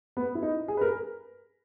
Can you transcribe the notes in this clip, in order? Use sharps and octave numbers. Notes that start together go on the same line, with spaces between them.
B3
E4
D#4
G#4
B4
A#4